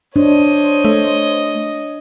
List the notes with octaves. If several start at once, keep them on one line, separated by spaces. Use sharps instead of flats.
D4 C5 C#5 D#5
A3